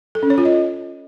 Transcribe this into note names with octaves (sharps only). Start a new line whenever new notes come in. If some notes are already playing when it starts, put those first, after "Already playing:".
A4
C#4
C#5
F4
D#5